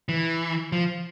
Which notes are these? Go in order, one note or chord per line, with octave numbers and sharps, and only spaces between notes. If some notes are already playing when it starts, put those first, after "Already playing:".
E3
F3